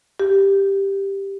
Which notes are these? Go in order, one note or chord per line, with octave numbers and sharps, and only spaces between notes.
G4